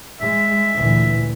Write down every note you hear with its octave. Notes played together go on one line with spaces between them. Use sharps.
G#3 E5
D2 A#2 E3